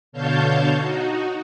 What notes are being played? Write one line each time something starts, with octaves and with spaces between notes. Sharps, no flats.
B2 D3 C#5 F5 A5 G6
D#4 F#4